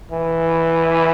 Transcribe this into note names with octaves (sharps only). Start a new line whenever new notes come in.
E3